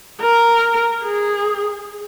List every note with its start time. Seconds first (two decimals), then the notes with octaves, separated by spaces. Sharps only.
0.21 A#4
1.03 G#4